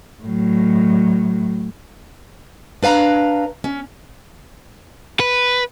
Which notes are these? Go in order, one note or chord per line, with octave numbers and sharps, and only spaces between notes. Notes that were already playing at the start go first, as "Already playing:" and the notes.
A2 F#3
D4 B4 F5 A5 A#5
C#4
B4